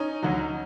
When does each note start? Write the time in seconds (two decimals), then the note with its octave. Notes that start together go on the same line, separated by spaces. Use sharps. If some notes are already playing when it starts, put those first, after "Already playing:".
Already playing: C#4 D#4
0.22 D2 D3 F#3